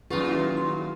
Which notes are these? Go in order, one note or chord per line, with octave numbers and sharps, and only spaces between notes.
D#2 A#2 F#3 C#4 D#4 F4 G#4 B4
E4 F#4
C6